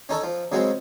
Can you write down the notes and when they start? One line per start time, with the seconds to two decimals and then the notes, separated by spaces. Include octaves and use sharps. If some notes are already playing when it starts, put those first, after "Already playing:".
0.09 C#4 D#4 A4 C#5
0.23 F3
0.52 C#3 F#3 G#3 C4